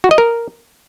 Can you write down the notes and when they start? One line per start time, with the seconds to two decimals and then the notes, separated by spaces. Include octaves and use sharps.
0.04 F#4
0.11 D#5
0.18 A#4